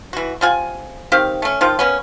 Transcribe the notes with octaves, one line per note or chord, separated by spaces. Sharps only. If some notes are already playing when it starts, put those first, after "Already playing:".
E3 F#4
C3 F4 G#5
D#3 C4 G4 F5
A3 C#4
D#3 F3 F4
A#3 B3 C#4